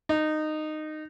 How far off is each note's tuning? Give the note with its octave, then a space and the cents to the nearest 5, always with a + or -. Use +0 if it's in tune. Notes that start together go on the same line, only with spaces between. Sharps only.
D#4 -15